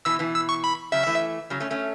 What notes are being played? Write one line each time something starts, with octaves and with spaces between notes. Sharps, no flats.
B2 E3 E6
B2 E3
E6
C#6
B5
C#3 F#3 E5
E3 A3
C#3 F#3
A3 C#4
A3 C#4